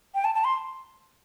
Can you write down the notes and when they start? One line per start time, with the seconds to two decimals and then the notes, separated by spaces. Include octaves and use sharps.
0.15 G5
0.24 A5
0.35 A5
0.44 C6